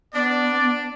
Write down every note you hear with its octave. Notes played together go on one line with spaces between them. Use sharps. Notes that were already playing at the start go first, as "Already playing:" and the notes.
B3 D4 D5